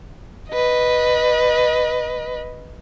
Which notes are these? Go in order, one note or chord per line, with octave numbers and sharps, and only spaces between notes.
B4 D#5